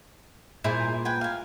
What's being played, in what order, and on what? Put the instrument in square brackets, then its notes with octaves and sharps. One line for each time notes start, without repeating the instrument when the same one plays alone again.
[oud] A#2 [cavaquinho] E4 G#4 C5
[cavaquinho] B4 G5 G#5
F5 G#5